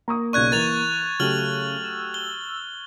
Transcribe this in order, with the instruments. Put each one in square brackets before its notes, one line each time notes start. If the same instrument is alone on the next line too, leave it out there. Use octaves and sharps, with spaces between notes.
[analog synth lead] A#3 [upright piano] A#5 C#6 D#6
[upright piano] B1 C#3 D5 [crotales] C#6 F#6 G#6
[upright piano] E3 A#4 [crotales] A6 F7
[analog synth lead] C#3 [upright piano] F#3 A3 G4 [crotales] F6 F#7
[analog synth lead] E6
[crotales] G7